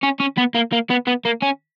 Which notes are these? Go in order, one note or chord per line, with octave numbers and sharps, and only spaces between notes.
C#4
C#4
B3
A#3
A#3
B3
B3
A#3
C#4